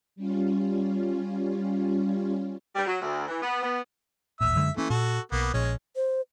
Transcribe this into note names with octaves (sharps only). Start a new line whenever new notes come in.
G3 C#4 F4
G3
F#3
D2
E3
B3
B3
D#1 A1 A#2 E5 E6
F#2 D3 G#3
E3 A3 A#3 C#4
A#2 F#4 A4
B1 A#3 B3
A#1 G#3 C#4
C5